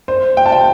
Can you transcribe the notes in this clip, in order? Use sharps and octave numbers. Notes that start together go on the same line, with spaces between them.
C5
G5
A5
G5